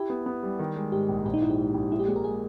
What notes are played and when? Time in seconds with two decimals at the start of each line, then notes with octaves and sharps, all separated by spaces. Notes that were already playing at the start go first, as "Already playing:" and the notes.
Already playing: E4 G4
0.10 B3
0.26 B3
0.43 G3
0.59 D#3
0.76 G#3
0.92 G#2 G4
1.09 A#1
1.25 A#1 G4
1.34 D#4
1.42 G#2 E4
1.50 G4
1.59 G#2
1.74 A#1
1.91 G#3 E4
1.99 G4
2.07 A#2 G#4
2.16 A#4
2.24 G#3 G#4